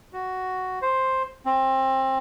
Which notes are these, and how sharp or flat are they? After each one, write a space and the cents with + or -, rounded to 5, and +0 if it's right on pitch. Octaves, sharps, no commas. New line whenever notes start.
F#4 +5
C5 +5
C4 +25